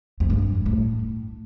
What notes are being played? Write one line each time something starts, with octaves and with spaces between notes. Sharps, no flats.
F2
G2
A2